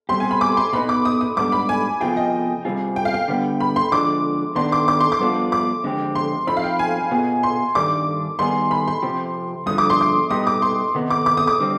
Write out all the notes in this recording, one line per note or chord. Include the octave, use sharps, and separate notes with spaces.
B2 G3 C4 G4 C6
G#5
B5
D6
C6
B2 B3 D#4 B5
D6
D#6
D#6
G#2 G3 B3 D4 D6
B5
G#5
C3 F3 B3 F4 G#4 G5
D#5
C3 G3 C4 F4 G#4
G5
F5
G5
D3 G3 B3
B5
C6
D3 F3 G#3 D4 D6
D#3 B3 D4 G4 C6
D6
D6
C6
D6
G2 F3 B3 D4 F4
D6
F2 D3 G#3 C4 G4
C6
F3 C4 D#4 B5
F5
G5
G#5
B2 B3 F4 G#4
C6
G2 D#3 G3 D4 D6
D#3 G3 B3 D#4 G#4 C6
B5
C6
C3 F3 C4 G4
G2 D3 F3 D#6
D6
C6
D6
B2 G3 B3 D#4 G4 D#6
D6
C6
C3 D#3 B3 D#4
D6
D6
D#6
D6
D3 G3 C4